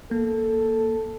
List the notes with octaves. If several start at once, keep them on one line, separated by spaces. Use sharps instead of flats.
A#3 A4